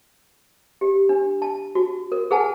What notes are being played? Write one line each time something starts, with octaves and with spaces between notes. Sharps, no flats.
G4
D4
A5
F#4
A#4
G#4 A#4 B4 F#5 G#5 A5